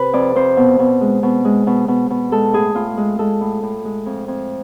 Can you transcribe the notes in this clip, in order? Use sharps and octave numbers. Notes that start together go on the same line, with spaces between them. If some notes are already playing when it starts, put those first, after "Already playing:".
Already playing: C3 B4
F2 D5
F2 C5
B2
B2
G#3
B2
G#3
B2
B2
B2
G#3 A4
A2 G#4
A2 F4
G#3
G#3 A4
A2
A2
G#3
F2
F2